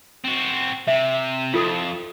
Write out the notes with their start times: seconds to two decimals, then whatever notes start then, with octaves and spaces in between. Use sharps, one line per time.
0.24 C4 F#4
0.88 C3 E5
1.54 F2 F4 A4 D#6